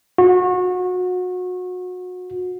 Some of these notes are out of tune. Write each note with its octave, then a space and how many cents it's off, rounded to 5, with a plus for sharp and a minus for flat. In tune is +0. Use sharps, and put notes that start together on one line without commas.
F#4 -30